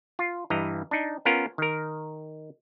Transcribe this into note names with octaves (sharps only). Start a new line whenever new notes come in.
F4
G2 E3 D#5 A#5
D4 D#4
B3 C#4 F4 A#4
D#3 A#4